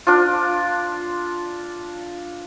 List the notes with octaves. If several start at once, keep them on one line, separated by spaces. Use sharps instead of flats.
D4 F4